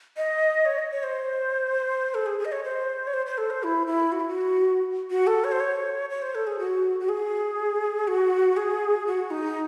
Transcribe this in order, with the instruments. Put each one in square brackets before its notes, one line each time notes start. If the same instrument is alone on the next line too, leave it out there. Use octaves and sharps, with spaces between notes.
[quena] D#5
C#5
D#5
C#5
C5
A4
G#4
G#4
D#5
C#5
C5
C#5
C5
C5
A4
C5
E4
E4
F#4
E4
F#4
F#4
A4
C#5
C5
C#5
C#5
C5
A4
G#4
F#4
F#4
G#4
F#4
G#4
F#4
D#4